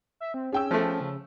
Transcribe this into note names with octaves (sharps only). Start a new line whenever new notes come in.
E5
C4
C#4 G#4 G5 E6
F3 A3
C#3